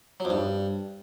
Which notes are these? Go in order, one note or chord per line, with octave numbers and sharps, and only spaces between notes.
F#3
F2
G2